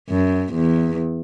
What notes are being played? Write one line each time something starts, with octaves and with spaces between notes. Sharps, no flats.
F#2
E2